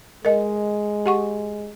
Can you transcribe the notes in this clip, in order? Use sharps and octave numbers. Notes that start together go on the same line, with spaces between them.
G#3 A#4 D#5
G4 F#5 C#6